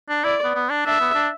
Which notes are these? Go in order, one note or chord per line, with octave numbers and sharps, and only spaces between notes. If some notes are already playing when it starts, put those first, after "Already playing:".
D4
E4 D5
B3
B3
D4
D4 E5
B3
D4